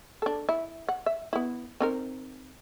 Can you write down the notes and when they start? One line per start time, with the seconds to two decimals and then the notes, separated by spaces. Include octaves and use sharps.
0.22 D4 A4
0.49 E4
0.89 F#5
1.06 E5
1.33 B3 E4
1.80 C4 D#4 A#4